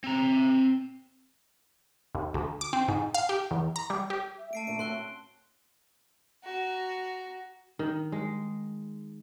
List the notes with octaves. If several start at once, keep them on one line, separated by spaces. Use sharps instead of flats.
C4 A#5
D#2
D2
D6
C4
G#2
F5
G4
E2
A#5
G3
G4
E5
A3 A5 C7 D7
A#2 D3 E5 D7
C4 C#4 F#4 C6 F#6 G7
F#4 A#5
D#3
G#3